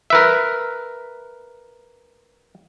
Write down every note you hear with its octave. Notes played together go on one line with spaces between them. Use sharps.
A#4 B4 E5